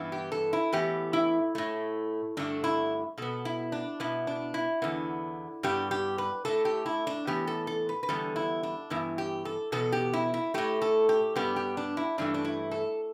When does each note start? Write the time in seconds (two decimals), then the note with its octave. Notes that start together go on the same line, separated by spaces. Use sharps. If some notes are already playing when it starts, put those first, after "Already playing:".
Already playing: G2 E3 B3
0.12 G4
0.32 A4
0.53 E4
0.73 A2 E3 B3 G4
1.13 E4
1.55 A2 A3
2.37 G2 D3 A3 D4
2.64 E4
3.18 B2 B3 A4
3.45 E4
3.72 D4
4.00 B2 B3 E4
4.27 D4
4.54 E4
4.82 E2 D3 B3
5.63 G2 G3 B3 G4
5.91 G4
6.18 B4
6.45 A2 A3 A4
6.65 G4
6.86 E4
7.07 D4
7.27 A2 E3 B3 G4
7.47 A4
7.67 A4
7.89 B4
8.03 B4
8.09 E2 D3 G3 B3 A4
8.36 E4
8.63 D4
8.90 G2 E3 B3 E4
9.18 G4
9.45 A4
9.72 E2 B2 B3 A4
9.92 G4
10.13 E4
10.34 E4
10.54 A2 A3 G4
10.82 A4
11.09 G4
11.36 G2 G3 B3 G4
11.56 G4
11.77 D4
11.97 E4
12.18 G2 E3 A3 D4
12.34 D4
12.45 E4
12.71 A4